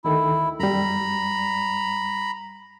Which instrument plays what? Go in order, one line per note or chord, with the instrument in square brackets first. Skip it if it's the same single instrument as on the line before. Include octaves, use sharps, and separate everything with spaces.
[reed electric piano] D2 D#3 A4 [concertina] E4
[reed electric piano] F#2 G3 [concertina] A#5 B5